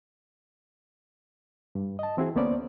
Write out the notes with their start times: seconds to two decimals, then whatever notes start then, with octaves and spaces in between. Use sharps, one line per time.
1.75 G2
1.99 D#5 A5
2.17 E3 C4 E4 F#4 G#4
2.35 D2 A#3 B3 C#4 C5 D5